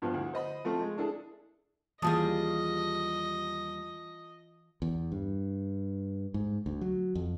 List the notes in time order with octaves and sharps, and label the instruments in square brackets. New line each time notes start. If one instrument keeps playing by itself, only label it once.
[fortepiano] G2 F3 B3
D2 E4
C5 D#5 B5
F3 A3 C4
G#3
D4 E4 G#4 A4
[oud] D#2 G3 G#4 [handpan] E3 [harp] F4 A5 D#6 [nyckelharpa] D#5
[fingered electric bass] E2
G2
G#2
D2
F#3
F2